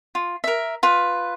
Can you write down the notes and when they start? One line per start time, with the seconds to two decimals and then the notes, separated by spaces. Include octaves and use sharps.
0.15 F4
0.44 A#4 E5
0.83 F4 B4